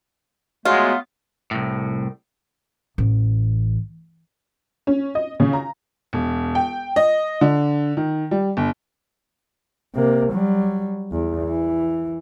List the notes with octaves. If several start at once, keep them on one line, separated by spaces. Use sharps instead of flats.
F#3 G#3 A3 B3 F4
C2 A2
A1
C#4
D#5
C#3
A#5
E1
G5
D#5
D3
D#3
G3
G1
C3 A#3
F#3 G3
E2
E3